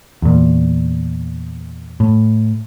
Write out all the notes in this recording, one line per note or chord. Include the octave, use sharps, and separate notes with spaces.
E2 A#2
A2